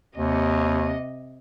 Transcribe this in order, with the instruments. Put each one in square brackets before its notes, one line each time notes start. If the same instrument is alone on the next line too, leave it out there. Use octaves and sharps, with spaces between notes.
[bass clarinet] D#2 [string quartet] C3 D#5